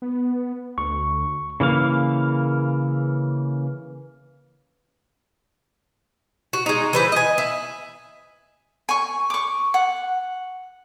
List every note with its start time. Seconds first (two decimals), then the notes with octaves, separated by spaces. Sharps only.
0.02 B3
0.78 D2 C#6
1.60 C#3 E3 A#3 F5
6.53 F#4
6.66 G#3 D#4
6.93 E3 B4 C5
7.12 D#5 G#5
7.38 E4
8.89 G#5 C#6
9.30 C#6 D6
9.74 F#5